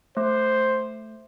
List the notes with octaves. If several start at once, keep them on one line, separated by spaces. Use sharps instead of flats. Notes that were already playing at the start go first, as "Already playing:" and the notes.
A3 C5